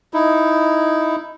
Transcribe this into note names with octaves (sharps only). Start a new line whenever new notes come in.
D#4 E4